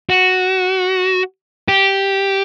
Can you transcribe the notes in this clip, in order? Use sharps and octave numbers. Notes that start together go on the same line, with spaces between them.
F#4
G4